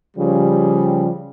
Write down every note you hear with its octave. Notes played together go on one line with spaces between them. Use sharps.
C#3 F3 G3